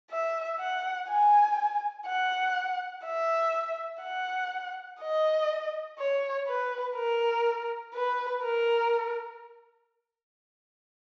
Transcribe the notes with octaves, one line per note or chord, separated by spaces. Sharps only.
E5
F#5
G#5
F#5
E5
F#5
D#5
C#5
B4
A#4
B4
A#4